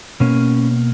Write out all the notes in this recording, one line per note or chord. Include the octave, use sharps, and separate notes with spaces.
B2 A#3 C#4